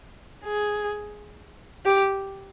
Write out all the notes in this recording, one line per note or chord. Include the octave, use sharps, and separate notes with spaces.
G#4
G4